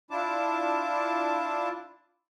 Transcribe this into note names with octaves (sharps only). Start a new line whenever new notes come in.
D4 E4 F4 A5 D6